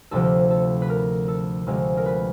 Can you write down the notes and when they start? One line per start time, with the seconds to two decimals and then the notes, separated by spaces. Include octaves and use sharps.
0.11 D2 C3 F3 A4
0.50 A4
0.82 B4
0.89 A#4
1.28 A4
1.67 D2 C3 F3 G#3
1.97 A#4
2.06 B4